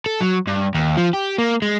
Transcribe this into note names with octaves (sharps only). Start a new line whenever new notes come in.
A4
F#3
G2
D#2
F3
G4
A#3
G#3